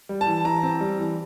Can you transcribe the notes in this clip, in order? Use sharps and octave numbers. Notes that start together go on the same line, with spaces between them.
G3
A5
E3
E3 A#5
C4
G3
E3